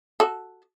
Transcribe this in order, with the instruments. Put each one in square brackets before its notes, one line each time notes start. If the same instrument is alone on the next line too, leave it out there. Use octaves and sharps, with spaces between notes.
[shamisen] F#4 A4